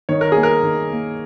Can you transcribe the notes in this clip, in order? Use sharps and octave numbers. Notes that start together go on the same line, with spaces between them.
D#3 C#5
A#4
A#3 G#4
A#4
D#3
A#3